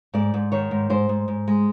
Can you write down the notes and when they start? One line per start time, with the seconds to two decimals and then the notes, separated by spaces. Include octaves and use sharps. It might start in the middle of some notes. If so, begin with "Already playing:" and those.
0.14 G#2 D5
0.34 G#2
0.52 D#3 C#5
0.71 G#2
0.90 G#2 C5
1.09 G#2
1.28 G#2
1.48 G#3